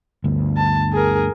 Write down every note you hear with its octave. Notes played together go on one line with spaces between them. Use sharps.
G1 D2
A5
G#4 A#4